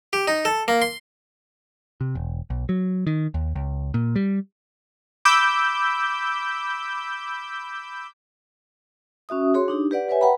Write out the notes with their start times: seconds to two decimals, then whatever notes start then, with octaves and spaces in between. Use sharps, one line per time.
0.13 G4
0.28 D#4
0.45 A4
0.68 A#3
0.82 C6
2.01 C3
2.15 E1
2.50 B1
2.69 F#3
3.07 D#3
3.34 D#2
3.55 C#2
3.94 A#2
4.16 G3
5.25 B5 D6 E6 G6
9.29 C#4 F#4 E5 D#6
9.54 F#4 G#4 C#5 C6
9.68 D4 D#4 G4
9.91 G4 B4 D5 F#5
10.08 G4 B4 C#5 E5 G#5
10.21 B4 F#5 G5 A#5 B5